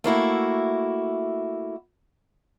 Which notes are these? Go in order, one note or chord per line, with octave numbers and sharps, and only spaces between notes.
A3 A#3 E4 F#4